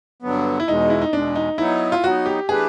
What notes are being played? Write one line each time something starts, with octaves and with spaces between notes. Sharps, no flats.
G2 D3 F#3 B3
E4
E2 B2 G#3 D#4
E4
D#4
E2 B2 G#3 D4
D#4
F#3 B3 D#4 E4
F4
F#3 B3 D#4 F#4
G4
E3 A3 D4 G4 G#4 B4